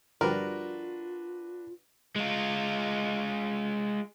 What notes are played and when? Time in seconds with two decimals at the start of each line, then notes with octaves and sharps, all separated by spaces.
0.21 G1 F3 G3 D4 F4 F#4 A#4 B4
2.16 G#3 F4